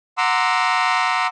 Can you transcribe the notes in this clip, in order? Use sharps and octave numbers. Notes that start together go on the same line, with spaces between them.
F#5 A#5 C6 D6 E6